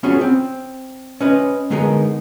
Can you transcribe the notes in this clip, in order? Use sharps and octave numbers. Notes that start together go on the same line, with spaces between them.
B3 C#4 F4 F#4 G#4 C#5
C4
C#4 B4 D#5
D3 G#3 B3 D#4 G#4 A#4